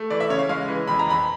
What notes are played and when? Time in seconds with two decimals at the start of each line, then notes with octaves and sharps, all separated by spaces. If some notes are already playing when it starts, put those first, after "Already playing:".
Already playing: A3
0.10 E3 D5
0.20 E5
0.30 C#3 C#5
0.39 F5
0.49 G#3 F5
0.68 E3
0.87 F2 B5
0.99 A#5
1.07 F2 B5